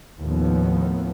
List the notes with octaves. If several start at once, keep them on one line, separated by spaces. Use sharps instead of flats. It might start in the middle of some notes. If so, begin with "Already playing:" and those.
D#2 A2 F3 B3